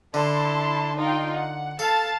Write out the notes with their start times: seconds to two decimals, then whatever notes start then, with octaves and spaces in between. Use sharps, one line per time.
0.14 D3 E4 A5 C6
0.97 D#4 F4 G5
1.34 F#5
1.79 A4 F5 A5 A6